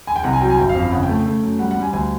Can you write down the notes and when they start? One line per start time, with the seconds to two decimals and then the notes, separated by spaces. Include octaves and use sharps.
0.07 G#5
0.16 G5
0.23 C2 F#5
0.33 G#5
0.41 F#3 G5
0.50 G#5
0.58 G1 G5
0.69 F5
0.75 F2
0.80 F5
0.91 C#3 F#5
1.03 G5
1.09 A3
1.15 G5
1.26 A3
1.43 F#2
1.59 G3 F#5
1.71 F#5
1.77 G3
1.82 G#5
1.93 D2 G#5